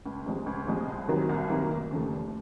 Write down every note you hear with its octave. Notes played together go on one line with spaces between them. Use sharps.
C#2
C3 F3 G#3
C#2
C3 F3 G#3
C2
C3 D#3 F#3 A#3
C2
C3 D#3 F#3 A#3
F1
D#2 C#3 F3 A3
F1